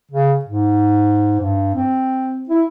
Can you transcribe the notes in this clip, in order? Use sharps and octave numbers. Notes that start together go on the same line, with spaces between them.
C#3
G#2
G2
C4
E4